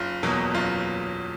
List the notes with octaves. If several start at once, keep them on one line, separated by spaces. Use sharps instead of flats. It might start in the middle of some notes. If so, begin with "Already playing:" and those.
Already playing: F#1 F4
E2 B2 F#3 A#3
F#1 F4